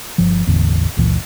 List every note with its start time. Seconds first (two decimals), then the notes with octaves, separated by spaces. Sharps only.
0.18 G1 F3
0.47 E1 A1 E2 D3
0.97 F#1 C#2 A#2 E3